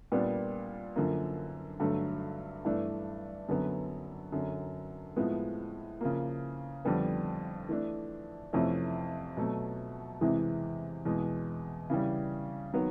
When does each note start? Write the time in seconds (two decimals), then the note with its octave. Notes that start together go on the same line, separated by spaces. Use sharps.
0.12 A#2 G3 B3 D4
0.96 F#2 D3 F3 A#3
1.80 G2 D3 F#3 A3
2.65 G2 E3 A3 D4
3.49 F#2 D3 F#3 B3
4.32 F#2 D3 F#3
5.16 A2 F3 G#3 B3
6.01 C#3 F3 A#3
6.85 F2 D3 G3 B3
7.69 E3 A3 D4
8.53 F2 C3 E3 A3 C#4
9.37 B2 F#3 A3
10.21 E2 C3 E3 G#3
11.05 E2 B2 G#3
11.90 C#3 E3 G3
12.74 D#3 F#3 B3